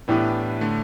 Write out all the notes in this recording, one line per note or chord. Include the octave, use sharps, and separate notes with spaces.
A2 E3 B3 D4 G4 B4
D3 A3